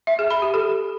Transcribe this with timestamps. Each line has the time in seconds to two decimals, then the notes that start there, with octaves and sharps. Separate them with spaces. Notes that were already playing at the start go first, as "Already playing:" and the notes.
0.07 E5
0.19 G#4
0.30 B5
0.42 G4
0.54 A4